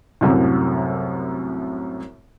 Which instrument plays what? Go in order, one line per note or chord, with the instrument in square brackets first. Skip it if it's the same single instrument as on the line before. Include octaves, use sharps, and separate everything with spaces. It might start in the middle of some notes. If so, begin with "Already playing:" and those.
[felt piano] C2 F#2 A2 C3